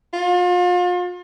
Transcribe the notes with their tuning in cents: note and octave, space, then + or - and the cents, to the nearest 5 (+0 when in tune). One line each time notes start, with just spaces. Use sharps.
F4 +35